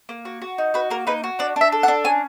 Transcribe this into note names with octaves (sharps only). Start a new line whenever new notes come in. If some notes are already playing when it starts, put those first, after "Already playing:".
A#3
F#4
F#4
D#4
F#4 B4
A#3 A#4
D#4 B4
F#4
D4 D5
D4 E5
A4
F#5
D4
C#4 G#5